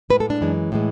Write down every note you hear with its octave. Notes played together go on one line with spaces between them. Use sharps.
A2 G#3 B4
A4
D4
F#2 E3 G#3
A2 E3 G#3